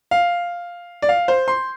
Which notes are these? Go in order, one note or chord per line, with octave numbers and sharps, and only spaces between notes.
F5
D5
F5
C5
C6